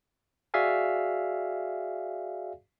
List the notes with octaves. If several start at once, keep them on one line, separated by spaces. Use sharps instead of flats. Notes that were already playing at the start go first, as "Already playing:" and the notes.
F#4 G#4 D5 E5 F5 G#5